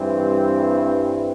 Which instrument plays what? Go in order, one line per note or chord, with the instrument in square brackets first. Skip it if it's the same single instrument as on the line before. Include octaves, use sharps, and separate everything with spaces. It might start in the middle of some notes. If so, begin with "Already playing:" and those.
Already playing: [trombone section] G2 E3 G3 C4